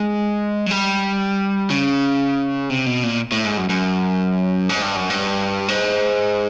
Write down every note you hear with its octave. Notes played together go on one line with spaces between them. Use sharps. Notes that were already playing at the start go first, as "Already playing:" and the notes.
Already playing: G#3
F#3
G3
C#3
C3
B2
A#2
A2
G#2
F#2
F#2
G#2
G2
F#2
G2
G#2